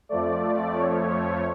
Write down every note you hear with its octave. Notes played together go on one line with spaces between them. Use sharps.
F2 F3 A3 D5
C#5